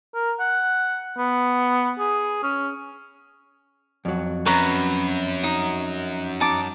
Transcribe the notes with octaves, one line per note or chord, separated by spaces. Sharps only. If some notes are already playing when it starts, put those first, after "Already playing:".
A#4
F#5
B3
G#4
C#4
F2 F#3
F#2 B4 C#5 A#5
D#4
D#4 A5 D6